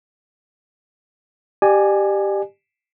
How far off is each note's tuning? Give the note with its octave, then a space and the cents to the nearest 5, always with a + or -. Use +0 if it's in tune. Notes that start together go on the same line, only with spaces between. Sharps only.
G4 +0 D5 +40 G#5 +5